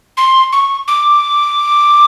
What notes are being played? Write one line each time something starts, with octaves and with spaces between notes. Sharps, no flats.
C6
C#6
D6